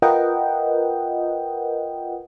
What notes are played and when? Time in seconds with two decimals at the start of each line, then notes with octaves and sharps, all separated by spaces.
0.02 F4 A#4 B4 D#5 F#5 G5